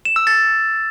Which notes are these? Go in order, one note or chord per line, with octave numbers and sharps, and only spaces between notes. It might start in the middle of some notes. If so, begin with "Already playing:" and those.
E7
E6
A6